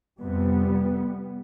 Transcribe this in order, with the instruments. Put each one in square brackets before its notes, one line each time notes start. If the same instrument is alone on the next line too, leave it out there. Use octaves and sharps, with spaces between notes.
[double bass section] F2 C3 G3 B3